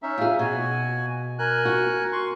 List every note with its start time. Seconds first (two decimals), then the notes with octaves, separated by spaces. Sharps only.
0.02 C#4 D#4 E5
0.18 F4 G#4
0.39 B2 F#4 G#5
1.39 A#4 G#5 F#6
1.65 F#4
2.12 C6 C#6